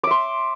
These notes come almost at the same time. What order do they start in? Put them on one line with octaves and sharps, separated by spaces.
D6 E5 C6